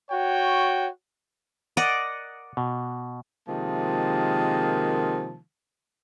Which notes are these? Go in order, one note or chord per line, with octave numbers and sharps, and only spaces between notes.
F#4 C#5 G5
A#4 D5 D#5 F#5
B2
C3 D#3 F3 G#3 A#3 A5